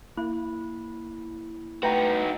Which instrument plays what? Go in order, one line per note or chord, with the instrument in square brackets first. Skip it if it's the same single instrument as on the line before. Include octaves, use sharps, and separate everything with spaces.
[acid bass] A#3 [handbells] E4
[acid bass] A3 [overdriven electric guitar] D#4 F#4 [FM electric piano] B4 G5 A#5